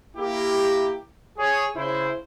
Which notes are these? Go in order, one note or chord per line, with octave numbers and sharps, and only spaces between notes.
A#3 E4 G4
G#4 C#5
C#3 E4 C5